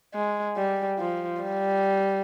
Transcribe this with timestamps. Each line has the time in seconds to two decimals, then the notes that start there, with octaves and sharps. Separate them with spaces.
0.14 G#3
0.56 G3
0.99 F3
1.42 G3